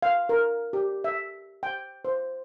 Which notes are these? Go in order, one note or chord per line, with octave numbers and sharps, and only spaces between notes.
F5
A#4
G4
E5
G5
C5